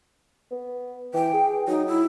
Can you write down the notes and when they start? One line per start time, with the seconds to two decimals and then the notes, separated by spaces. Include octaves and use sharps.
0.51 B3
1.14 E3 G5
1.33 G#4
1.68 F#3 D#4
1.87 E4